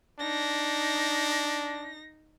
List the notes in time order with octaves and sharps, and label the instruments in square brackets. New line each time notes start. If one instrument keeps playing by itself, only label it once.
[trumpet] D4 [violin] D#4 A#6